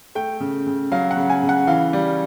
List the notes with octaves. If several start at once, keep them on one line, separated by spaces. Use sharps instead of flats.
A3 G5
C#3
C#3
F#3 F5
F#5
C#3
G#5
C#3
F#5
E3 F5
G3